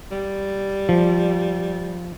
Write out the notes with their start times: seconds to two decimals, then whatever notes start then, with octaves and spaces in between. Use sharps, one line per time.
0.11 G3
0.89 F3